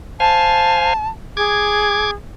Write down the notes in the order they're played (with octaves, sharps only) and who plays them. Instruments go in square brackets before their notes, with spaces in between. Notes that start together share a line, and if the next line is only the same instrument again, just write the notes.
[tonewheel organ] C5 F5 G#5 [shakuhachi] A5
[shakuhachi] G#4 [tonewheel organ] D6 G#6